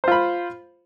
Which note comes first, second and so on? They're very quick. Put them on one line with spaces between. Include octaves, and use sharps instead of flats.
C5 F4 B5